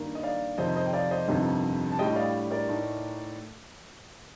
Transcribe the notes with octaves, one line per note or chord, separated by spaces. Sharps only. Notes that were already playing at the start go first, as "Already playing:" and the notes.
Already playing: G2 D#3 A#3
D#5
D5 F5
F2 C3 D#3 C5 D#5
C5 D#5
G5
D5 F5
C5 D#5
G1 F2 C3 D#3
A5
A2 G3 D4 D#5 G5
D5 F5
A#4 D5
A2 A3 D#4